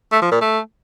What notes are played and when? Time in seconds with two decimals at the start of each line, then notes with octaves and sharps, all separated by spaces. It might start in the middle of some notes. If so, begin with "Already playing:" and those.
0.12 A3
0.22 F3
0.31 A#2
0.41 A3